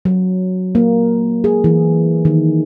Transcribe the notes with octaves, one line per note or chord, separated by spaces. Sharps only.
F#3
A#3
G#4
E3
D#3